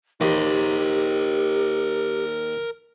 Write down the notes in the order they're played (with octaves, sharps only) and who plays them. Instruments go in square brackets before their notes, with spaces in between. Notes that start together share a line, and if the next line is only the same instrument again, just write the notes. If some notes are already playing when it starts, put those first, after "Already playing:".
[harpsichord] D#2 [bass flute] G4 [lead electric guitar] A#4 C5